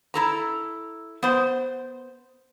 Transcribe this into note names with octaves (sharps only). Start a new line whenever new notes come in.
E4 A4 A#5
B3 C5